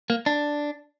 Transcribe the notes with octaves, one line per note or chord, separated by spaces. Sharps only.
A#3
D4